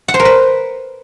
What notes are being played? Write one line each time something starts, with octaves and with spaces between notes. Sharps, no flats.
F#5
C5
A#4
B4